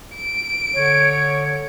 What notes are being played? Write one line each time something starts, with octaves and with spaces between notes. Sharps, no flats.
D7
D3 C#5